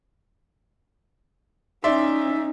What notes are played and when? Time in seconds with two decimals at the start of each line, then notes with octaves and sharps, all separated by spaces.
1.84 C#4 D#4 D5 E5 C6